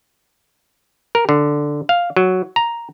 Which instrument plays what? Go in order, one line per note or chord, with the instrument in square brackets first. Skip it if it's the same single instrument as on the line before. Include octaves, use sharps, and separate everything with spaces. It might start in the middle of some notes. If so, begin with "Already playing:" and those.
[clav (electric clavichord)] A#4
D3
F5
F#3
A#5